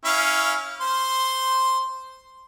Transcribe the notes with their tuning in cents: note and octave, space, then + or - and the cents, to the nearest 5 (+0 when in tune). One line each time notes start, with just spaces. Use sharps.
C#4 +0 E4 -25 F5 +0
C5 -5 C6 +0